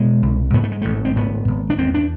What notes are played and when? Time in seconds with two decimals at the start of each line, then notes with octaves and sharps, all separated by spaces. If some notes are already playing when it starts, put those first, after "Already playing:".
Already playing: B2 G#3
0.23 C2
0.53 G#2 B3
0.64 A3
0.72 G#3
0.82 A1 A3
1.05 C4
1.16 G#2 B3
1.48 G#1
1.70 D4
1.78 E2 C4
1.94 D4